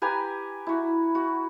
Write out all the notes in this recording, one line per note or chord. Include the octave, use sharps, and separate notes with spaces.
G4 B4 G#5 A#5
E4 F#4
F#4